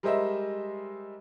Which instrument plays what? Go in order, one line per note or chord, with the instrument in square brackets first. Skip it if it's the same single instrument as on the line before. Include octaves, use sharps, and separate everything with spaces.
[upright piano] G3 G#3 A#4 C5 D#5 E5